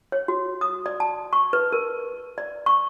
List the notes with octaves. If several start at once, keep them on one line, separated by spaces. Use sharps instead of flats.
C#5
F#4
D#6
D5
A5
C#6
B4
A#4
D5
C#6